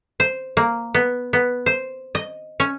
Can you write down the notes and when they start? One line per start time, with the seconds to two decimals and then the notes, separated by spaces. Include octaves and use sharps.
0.20 C5
0.57 A#3
0.94 B3
1.33 B3
1.66 C5
2.15 D#5
2.60 C#4